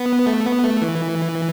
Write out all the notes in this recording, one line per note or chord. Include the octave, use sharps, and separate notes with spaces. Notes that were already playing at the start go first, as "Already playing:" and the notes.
Already playing: B3
A3
B3
A3
E3